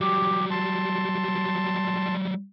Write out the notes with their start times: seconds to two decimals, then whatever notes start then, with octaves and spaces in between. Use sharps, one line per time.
0.01 F#3 G3 G4
0.51 A5 C6